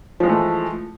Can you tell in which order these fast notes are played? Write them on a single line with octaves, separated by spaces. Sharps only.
F3 G#3 E3 A3